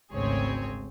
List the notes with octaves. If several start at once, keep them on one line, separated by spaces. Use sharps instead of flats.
G#1 D2 C#3 C4 G#4 C#5